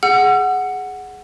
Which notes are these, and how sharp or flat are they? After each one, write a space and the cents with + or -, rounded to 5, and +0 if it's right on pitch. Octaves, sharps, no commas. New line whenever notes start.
G#4 +0 F#5 +0 E6 +45